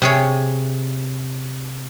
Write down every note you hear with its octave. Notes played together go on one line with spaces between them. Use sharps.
C3 G#4 C#5